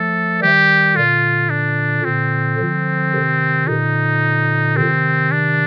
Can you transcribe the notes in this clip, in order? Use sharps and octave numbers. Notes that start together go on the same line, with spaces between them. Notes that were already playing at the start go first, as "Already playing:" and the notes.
Already playing: F3 A3 A4
D#3 G3 G4
A#2 D3 F4
D4
A#2 D3 C4
D3 F3
C3 D#3
A#2 D3 D#4
C3 D#3 C4
D4